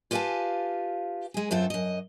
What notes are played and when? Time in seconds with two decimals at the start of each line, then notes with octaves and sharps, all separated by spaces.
0.11 F4 G4 B4 F5 G#5 A5
1.34 G#3 G#4
1.51 F#2 C4 F4 A4
1.70 F#2 D#5